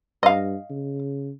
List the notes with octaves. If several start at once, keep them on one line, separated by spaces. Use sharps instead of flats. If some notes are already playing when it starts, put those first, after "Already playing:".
G2 D#5 F5
C#3